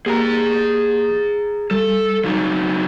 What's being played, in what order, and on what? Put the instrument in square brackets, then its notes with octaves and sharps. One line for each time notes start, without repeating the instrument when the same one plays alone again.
[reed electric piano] A#3 G4 [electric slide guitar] G#4 G5 A#5
[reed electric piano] G3 [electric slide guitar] A4
[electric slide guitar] C#3 F#3 D#4